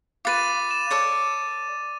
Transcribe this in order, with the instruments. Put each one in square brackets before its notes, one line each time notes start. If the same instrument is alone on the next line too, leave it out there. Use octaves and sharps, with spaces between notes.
[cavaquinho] F4 B4 [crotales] D6 A6 D#7
[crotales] E7
[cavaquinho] A4 C#5 D5